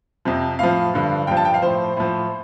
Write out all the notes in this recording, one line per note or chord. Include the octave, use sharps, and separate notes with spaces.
F2 C3 F3
A2 F3 F5
G2 D3 F3
G2 F3 G5
A5
G5
F5
A2 F3 C5
A2 F3